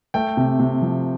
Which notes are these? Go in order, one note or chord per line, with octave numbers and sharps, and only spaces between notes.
A3 G5
C3
C3
F3